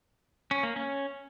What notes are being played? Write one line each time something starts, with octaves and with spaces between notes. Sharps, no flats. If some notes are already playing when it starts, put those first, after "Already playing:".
C#4
A#3
C#4